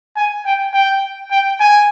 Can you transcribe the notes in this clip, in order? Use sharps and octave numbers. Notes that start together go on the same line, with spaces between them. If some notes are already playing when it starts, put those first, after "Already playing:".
G#5
G5
G5
G5
G#5